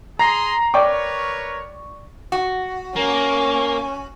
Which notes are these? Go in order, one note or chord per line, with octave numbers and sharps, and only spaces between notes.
G#4 A#5 C6 A#6 C7
A#4 B4 C#5 D5 G5 C#6 D6
F#4
A#3 C#4